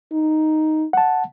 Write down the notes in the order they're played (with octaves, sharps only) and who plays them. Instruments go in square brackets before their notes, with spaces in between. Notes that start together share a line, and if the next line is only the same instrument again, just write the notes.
[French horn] D#4
[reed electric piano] F#5 A5